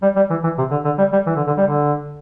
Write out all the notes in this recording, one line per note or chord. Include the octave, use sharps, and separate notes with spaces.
G3
G3
E3
E3
C3
D3
D3
G3
G3
E3
D3
D3
G3
D3